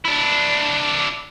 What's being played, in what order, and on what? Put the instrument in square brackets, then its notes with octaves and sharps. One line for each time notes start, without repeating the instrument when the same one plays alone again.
[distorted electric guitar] D4 E4